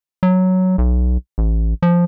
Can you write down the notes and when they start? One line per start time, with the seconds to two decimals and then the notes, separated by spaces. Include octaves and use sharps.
0.23 F#3
0.78 B1
1.38 A1
1.83 F3